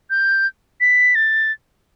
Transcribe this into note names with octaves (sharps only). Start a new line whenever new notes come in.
G6
B6
A6